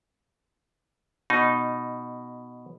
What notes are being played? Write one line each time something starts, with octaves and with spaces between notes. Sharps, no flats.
B2 D#4